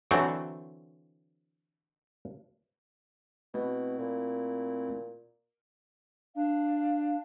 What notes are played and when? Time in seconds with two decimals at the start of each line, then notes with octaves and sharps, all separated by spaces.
0.11 D3 E3 F#3 A3 C4
3.54 B2 A3 C4 E4
3.99 A#2
6.35 D4 F5